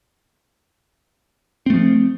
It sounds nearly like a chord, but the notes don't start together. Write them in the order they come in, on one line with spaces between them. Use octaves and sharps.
C4 A3 F3